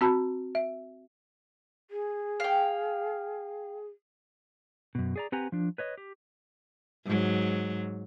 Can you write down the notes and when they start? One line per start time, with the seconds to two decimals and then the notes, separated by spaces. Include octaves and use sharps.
0.01 C4 F#4 A5 B5
0.55 E5
1.91 G#4
2.40 F5 G5
4.95 F#2 B2
5.16 G#4 D5 A#5
5.32 C4 G4 B4 F#5 G#5 A#5
5.52 F3 D4
5.78 B4 C#5 D#5
5.97 G4
7.05 G#2 F#3